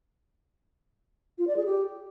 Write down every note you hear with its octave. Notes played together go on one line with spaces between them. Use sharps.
F4
D5
G#4
G4